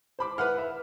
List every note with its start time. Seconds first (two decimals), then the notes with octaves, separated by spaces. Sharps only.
0.19 C5 B5 D6
0.38 B4 E5 F#5 F6
0.58 E5